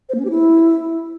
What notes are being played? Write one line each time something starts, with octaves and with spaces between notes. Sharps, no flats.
C5
A#3
C#4
G4
E4